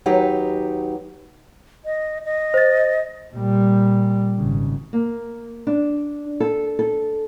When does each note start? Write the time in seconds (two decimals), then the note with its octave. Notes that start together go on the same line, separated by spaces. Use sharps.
0.06 D#2 F#3 D#4 G4 B4
1.85 D#5
2.25 D#5
2.54 C5 A6
3.34 A#2 G3
4.37 G#1 C#3
4.93 A#3
5.67 D4
6.40 A4
6.79 A4